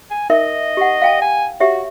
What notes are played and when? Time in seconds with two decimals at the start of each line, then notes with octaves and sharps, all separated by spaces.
0.11 G#5
0.30 D#4 A#4 D#5 E5
0.77 G4 F#5
1.02 F5 G5 A5
1.21 G#5
1.60 F#4 G4 C#5 E5